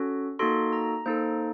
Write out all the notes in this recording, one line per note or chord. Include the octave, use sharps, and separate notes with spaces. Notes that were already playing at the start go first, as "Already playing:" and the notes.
Already playing: C#4 F#4 A4
A#3 D#4 F#4 A4 C6
A#5
A#3 D#4 A4 C5